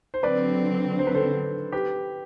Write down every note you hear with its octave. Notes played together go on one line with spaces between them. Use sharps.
C5
D3 F#3 C4 B4 D5
C5
B4
A4 C5
G4 B4